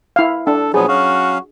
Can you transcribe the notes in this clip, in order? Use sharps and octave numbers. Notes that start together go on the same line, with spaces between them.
E4 F5
D4 A4
A#2 F3 F#3 B3 G#4
F#3 C#4 F#4 F5